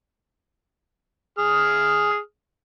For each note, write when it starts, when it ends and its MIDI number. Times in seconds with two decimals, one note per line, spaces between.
1.38 2.18 68
1.38 2.18 87
1.38 2.18 89